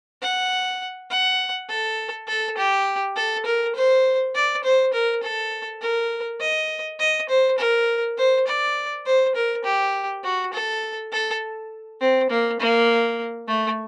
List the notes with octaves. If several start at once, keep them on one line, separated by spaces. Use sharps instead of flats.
F#5
F#5
A4
A4
G4
A4
A#4
C5
D5
C5
A#4
A4
A#4
D#5
D#5
C5
A#4
C5
D5
C5
A#4
G4
F#4
A4
A4
C4
A#3
A#3
A3